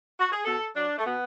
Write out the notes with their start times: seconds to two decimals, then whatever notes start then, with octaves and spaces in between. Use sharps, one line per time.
0.20 F#4
0.32 G#4
0.45 B2 A4
0.75 F#3 D4
0.98 A3
1.05 B2 B3